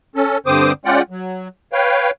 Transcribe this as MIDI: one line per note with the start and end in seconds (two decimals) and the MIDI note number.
0.16 0.38 61
0.16 0.38 69
0.46 0.72 43
0.46 0.72 50
0.46 0.72 60
0.46 0.72 72
0.46 0.72 86
0.46 0.72 87
0.85 1.02 56
0.85 1.02 61
0.85 1.02 65
0.85 1.02 74
0.85 1.02 78
0.85 1.02 79
1.10 1.48 54
1.73 2.11 71
1.73 2.11 73
1.73 2.11 77
1.73 2.11 79